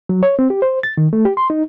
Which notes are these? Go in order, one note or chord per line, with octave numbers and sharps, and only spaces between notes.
F#3
C#5
C4
G4
C5
A6
D#3
A3
G4
C6
D#4